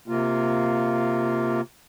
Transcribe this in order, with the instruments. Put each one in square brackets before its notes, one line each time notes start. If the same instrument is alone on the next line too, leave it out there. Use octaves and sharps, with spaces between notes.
[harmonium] C3 A#3 F4